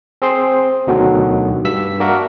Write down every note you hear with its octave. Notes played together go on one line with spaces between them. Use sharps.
C4 G#4 C5 C6
D2 B2 D3 D#3 F#3
G2 E6 B6
A#3 D4 F#4 A#4 E5 C#6